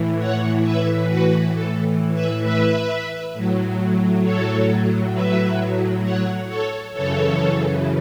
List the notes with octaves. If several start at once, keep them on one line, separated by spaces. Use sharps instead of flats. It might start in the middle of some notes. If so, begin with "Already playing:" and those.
Already playing: A2 E3
C#5 F#5
B4 E5
F#4 B4
A4
B4 E5
B4 E5
A2 F#3
A4 C#5
B4 E5
C#5 F#5
A4 C#5
F#2 C#3 E3 A4 C#5